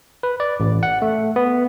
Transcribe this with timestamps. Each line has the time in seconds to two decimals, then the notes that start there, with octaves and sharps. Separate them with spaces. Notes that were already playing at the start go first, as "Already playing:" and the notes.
0.23 B4
0.40 D5
0.60 A1
0.83 F#5
1.02 A3
1.36 B3